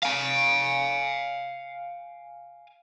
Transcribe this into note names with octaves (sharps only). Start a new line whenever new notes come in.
F5 G#5